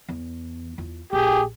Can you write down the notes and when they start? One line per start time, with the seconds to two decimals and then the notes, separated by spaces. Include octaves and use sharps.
0.08 E2
0.78 E2 F4
1.13 A#1 G4 G#4